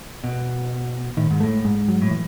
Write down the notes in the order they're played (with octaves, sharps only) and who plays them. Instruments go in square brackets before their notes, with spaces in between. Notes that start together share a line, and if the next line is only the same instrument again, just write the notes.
[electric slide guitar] B2
[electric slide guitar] A2 [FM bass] D#3
[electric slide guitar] G#2
[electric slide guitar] A2 [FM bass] A3
[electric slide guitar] G#2 [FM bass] G#3
[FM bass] F#3
[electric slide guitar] A2
[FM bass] E3